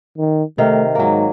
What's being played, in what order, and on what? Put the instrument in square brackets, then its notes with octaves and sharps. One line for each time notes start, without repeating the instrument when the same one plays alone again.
[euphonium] D#3
[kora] C3 D#3 F5 [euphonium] A3
[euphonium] G#2 [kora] F#3 A#3